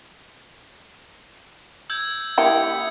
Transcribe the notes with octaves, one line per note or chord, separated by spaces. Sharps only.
E6 G6 G#6
A#3 E4 G4 D#6 G#6 C#7